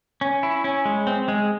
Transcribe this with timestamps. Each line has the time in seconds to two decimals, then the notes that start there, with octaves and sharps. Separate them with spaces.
0.21 C#4
0.43 E4
0.64 C#4
0.85 G#3
1.07 C4
1.28 G#3